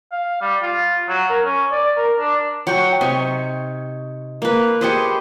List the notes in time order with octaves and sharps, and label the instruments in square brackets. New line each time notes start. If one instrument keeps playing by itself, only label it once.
[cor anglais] F5
G3
F4
F#3
A#4
C#4
D5
A#4
D4
[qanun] F#3 [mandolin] F#5 G5 C#6
[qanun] C3 [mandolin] D#4 C#5
[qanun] A#3 B4
[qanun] G4 G#4 C5 [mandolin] B4 D#5 C#6